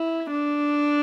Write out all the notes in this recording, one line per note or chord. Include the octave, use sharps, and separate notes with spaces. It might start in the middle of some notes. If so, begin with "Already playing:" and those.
Already playing: E4
D4